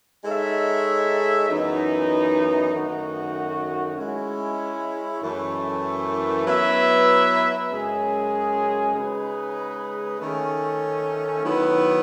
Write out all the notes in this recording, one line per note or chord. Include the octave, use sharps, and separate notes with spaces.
G#3 D#4 A4 C#5 E5
F#2 E3 B3 D#4
F#2 D#3 A3 D#4 F#4
G#3 C#4 E4
F#2 E3 A3
F#3 B3 E4 B4 E5
F#2 C#3 G#3 C#4 G#4
C#3 G#3 D#4 G#4 B4
D#3 A3 C#4
D#3 F#3 B3 E4 B4